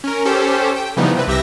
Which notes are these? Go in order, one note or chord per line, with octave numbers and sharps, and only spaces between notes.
C#4 A#4
C#4 G4 A4 C5
G5
C#3 E3 F3 G3 B3 D#4
C3 C4 B4
C2 C3 G4 E5 E6 A#6